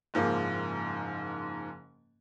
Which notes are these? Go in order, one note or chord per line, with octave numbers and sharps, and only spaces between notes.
F#1 G#2 F3 A#3 D6